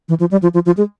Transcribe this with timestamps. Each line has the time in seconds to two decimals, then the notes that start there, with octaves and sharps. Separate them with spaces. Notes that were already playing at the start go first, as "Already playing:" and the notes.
0.09 E3
0.20 F3
0.31 G3
0.43 F3
0.54 F3
0.66 F3
0.77 G#3